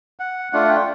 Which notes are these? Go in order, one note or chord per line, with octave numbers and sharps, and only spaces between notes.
F#5
A3 D4 F4 F#5
G5